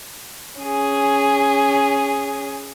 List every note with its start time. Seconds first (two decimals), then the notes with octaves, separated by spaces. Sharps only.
0.62 C#4 G#4